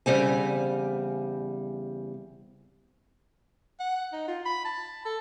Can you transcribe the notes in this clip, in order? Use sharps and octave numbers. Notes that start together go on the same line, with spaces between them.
E2 C#3 G3 C4 G#5
F#5
D#4
F4
B5
A5
A4